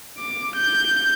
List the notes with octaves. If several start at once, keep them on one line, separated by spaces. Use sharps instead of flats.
D6
G6